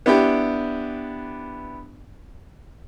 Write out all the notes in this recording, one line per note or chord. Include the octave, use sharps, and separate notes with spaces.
B3 D4 E4 G4 G5